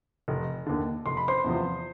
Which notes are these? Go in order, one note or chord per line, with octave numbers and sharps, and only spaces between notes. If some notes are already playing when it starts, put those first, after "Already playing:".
F1
D#2 D3
F1 C6
B5
C5 C6
E2 C3 F3